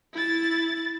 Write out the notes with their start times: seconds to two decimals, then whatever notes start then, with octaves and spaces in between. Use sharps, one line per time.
0.13 E4 A6